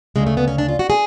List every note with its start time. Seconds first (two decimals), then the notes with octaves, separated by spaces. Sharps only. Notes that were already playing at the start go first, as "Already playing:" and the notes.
0.16 D2 C#3 G#3
0.27 A3
0.37 B3
0.48 C#4
0.58 D4
0.68 F4
0.79 F#4
0.90 G#4